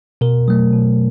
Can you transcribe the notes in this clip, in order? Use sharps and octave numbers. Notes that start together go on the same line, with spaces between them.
B2 A#4
F#3 A3
B2